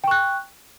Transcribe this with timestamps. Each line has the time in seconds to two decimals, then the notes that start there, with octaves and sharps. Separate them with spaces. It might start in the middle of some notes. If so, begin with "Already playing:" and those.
0.04 G5
0.07 C#6
0.11 F#6